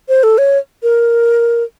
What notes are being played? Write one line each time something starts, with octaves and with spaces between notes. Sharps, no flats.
C5
A4
C#5
A#4